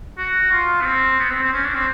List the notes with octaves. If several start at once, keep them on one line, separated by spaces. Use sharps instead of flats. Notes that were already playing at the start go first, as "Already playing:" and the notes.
F#4
F4
B3
C4
B3
C4
C4
C#4
D4
C4